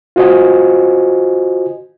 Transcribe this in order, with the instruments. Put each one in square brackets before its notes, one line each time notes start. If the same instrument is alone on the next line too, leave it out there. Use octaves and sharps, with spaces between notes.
[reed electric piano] F4 F#4 C5 D#5 G#5